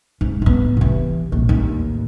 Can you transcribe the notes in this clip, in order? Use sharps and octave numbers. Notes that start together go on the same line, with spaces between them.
G#2
A2 B3
C3 E3
A#1
D#2 A2